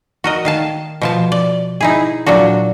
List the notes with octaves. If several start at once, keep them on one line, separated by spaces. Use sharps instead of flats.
F#4 A#4 D#5
D#3 F5 A5
B2 F3 A5
D5
D#4 E4 G#4
A#2 F#3 D4 F#4